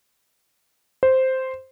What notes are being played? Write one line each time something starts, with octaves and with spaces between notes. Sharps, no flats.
C5